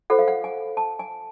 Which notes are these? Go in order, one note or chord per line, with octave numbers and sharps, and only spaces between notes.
F4 A4 C5 F#5
F5
F#5
G#5
A5
G#5